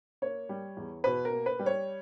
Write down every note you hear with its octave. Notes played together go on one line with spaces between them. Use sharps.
A#3 C#5
G3
E2
B2 B4
A#4
A#3
B4
G3
C#5